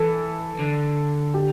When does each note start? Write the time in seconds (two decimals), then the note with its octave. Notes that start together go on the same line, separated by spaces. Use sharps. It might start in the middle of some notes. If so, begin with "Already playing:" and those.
Already playing: E3 A4
0.59 D3
1.34 G4